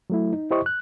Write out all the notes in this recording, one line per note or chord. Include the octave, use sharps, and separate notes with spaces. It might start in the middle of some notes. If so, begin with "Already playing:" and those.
F#3 A3 E4
D#4
E4 G4 C5 D#5 C#6
F#6